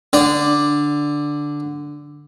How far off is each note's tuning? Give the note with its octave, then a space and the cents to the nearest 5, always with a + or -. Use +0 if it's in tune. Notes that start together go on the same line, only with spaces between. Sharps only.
D3 +0 D5 +0